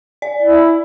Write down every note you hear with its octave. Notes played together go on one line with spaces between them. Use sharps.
D5
E4